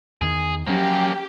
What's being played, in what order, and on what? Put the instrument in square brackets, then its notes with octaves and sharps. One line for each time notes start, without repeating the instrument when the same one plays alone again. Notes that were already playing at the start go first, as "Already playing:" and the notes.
[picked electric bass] E2 D#3 [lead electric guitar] G#4
[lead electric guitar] F#2 A#3 [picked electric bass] F3 F#3 C#4 [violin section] G4